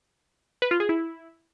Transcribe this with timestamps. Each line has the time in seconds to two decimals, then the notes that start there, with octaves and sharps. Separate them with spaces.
0.62 B4
0.71 F4
0.80 G#4
0.89 E4